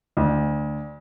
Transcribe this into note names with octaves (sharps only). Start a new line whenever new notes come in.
D2